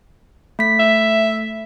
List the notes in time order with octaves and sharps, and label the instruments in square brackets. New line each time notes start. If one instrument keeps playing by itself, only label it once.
[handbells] A3 B6
[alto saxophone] E5